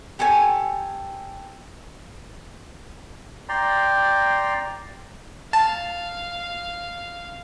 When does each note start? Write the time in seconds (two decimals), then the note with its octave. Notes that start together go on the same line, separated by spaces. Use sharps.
0.19 G4 A4 C#5 G#5
3.49 D5 G5 A#5 C6
5.53 F5 A5